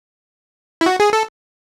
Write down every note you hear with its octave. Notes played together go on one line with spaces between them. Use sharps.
E4
F#4
G#4
A4